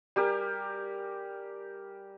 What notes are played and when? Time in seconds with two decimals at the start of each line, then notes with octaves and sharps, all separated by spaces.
0.16 G3 G4 A#4 G#5